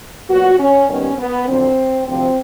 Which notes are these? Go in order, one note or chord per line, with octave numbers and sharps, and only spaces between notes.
A#2 F#3 B3 F#4
C#4
D#2 D#3 G3 B3 C#4
B3
F2 D3 F#3 C4
D2 C3 F3 C4